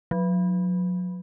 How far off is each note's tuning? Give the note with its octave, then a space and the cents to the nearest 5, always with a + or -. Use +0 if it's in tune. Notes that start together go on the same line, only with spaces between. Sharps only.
F#3 -40